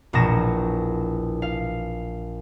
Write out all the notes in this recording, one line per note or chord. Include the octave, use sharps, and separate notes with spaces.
E1 A#1 A#2 D#6 A#6 E7
F5